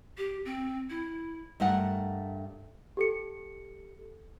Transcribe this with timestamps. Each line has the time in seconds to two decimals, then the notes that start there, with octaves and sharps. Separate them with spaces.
0.18 G4
0.45 C4
0.90 E4
1.60 G2 A3 A#4 F#5
2.97 G4 A4 C#7